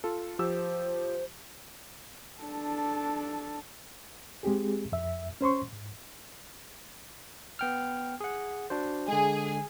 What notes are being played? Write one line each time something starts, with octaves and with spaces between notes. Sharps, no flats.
F4 A4
F3 G4 C5 E6
D4 A4
G#3 C4 G4 G#4
F2 E5
C#4 C5 C6 C#6
G#2
B3 G5 F6
G#4 F#5
D4 F#4 C5
D3 G#3 G#4